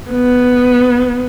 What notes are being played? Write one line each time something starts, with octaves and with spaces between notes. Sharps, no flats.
B3